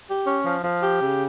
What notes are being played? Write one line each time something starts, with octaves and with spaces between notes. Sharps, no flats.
G4
C#4
F3
F3
G4
C#3